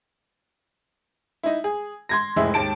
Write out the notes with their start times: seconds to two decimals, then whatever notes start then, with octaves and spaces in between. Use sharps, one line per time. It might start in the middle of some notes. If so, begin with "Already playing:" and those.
1.43 D#4 E4
1.64 G#4
2.09 C6 G#6 A#6
2.36 F1 A2 G#3 E5
2.54 D#2 G#2 A5 D7